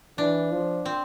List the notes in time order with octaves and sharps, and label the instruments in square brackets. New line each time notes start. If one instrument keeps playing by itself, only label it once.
[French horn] E3 [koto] D4
[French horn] F3
[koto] C4